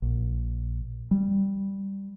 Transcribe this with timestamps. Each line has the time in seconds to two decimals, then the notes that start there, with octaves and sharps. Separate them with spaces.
0.02 A#1
1.11 G3